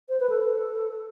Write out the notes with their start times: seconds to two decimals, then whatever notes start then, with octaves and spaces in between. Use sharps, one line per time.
0.09 C5
0.20 B4
0.30 A4